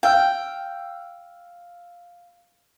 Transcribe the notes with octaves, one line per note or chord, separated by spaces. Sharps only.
F5 G5 E6 F6